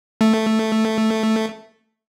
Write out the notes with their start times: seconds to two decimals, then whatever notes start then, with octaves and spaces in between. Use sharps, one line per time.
0.21 A3